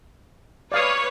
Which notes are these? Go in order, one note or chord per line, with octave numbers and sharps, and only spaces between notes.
B4 C#5 D5 F5 D#6